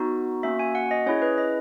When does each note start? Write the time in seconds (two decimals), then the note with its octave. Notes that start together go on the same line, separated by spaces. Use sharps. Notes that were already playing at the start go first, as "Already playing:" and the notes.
Already playing: B3 D#4 F#4
0.43 A#3 C#4 F#4 E5
0.59 G#5
0.75 F#5
0.91 D#5
1.06 C#4 E4 G#4 C#5
1.22 B4
1.38 D#5